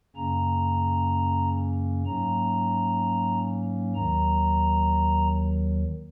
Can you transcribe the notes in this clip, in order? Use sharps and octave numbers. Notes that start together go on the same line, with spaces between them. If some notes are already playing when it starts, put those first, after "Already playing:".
F#2 C#3 A#3 C#4 A#5
G#2 F#3 A#3 C#4 A#5
D#2 D#3 F#3 A#5